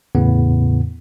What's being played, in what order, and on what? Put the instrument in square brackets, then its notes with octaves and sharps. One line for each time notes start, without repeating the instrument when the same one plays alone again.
[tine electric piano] E2 A2 C#3 B3